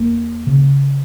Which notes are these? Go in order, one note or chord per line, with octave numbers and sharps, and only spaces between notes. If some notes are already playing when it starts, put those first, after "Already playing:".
Already playing: E2 A#3
C#3